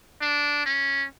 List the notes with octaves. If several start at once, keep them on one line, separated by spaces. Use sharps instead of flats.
D4
C#4